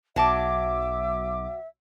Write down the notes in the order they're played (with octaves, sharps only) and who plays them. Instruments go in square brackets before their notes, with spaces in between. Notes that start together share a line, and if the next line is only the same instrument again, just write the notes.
[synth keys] B1 D6 [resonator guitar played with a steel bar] F#3 A5 [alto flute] E5